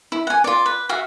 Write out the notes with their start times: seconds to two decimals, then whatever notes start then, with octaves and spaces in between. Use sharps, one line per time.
0.12 E4
0.27 F#5 G#5
0.44 F4 D5
0.66 B4
0.89 F#4 E5 F5